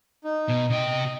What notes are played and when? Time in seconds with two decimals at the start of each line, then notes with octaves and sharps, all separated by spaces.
0.24 D#4
0.49 B2
0.70 C3 D#5 G5